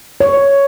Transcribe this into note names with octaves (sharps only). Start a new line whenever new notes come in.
C#5